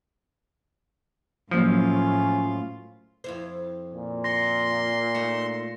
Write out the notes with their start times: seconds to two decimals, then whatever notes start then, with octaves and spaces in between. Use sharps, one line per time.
1.51 A2 F3 F#3 A#3 C#4 F4 C5
3.24 F2 E4 C5
3.94 A#2
4.24 C6 A#6 C#7
5.15 A3 D#4 C#7